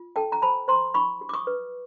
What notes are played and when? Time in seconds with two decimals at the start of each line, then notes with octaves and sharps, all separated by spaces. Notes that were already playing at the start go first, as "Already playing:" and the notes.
Already playing: F4
0.16 A4 G5 A5
0.32 A#5
0.42 C5 A5 B5
0.68 C5 A#5 C6
0.94 E4 B5 C#6
1.21 G4
1.29 D6
1.33 C#6 D#6
1.47 B4